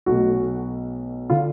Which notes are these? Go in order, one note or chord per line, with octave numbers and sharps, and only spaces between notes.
B1 B2 A3 F#4
D3 F4